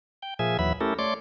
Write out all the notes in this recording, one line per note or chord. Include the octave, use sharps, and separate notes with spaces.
G5
A#2 F3 G#4 E5 G#5
D#2 E3 F#3 E5 B5
A3 C#4 E4 G4 A4 A#4
A3 C#5 D5 C6 D6